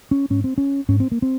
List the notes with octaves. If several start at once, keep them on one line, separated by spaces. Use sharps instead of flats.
C#4
G#2 C#4
C4
C#4
G#2 C#4
C4
A#3
C4